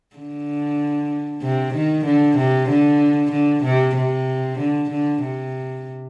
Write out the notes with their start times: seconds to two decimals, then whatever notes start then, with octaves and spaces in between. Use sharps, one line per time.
0.16 D3
1.43 C3
1.75 D#3
2.06 D3
2.38 C3
2.69 D3
3.32 D3
3.64 C3
3.96 C3
4.59 D3
4.90 D3
5.22 C3